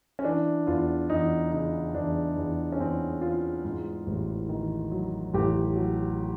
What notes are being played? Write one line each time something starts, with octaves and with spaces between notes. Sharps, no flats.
C#4
E3 D4
E2 F4
E2 D#4
C#3 D#4
E2 D4
E2
C#4
E2 C4
E3 F4
G#2
A1
D#3
F#3
A1 G4
F#3